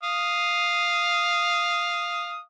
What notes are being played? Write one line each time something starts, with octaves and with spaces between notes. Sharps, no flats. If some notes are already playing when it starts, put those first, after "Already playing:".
F5 D#6